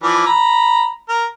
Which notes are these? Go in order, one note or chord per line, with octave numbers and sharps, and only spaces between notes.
E3 F3 D5
A#5 B5
A#4